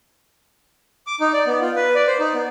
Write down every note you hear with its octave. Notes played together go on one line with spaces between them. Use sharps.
D6
D#4
D5
B3
F4
B4
D5
C5
D#4
B3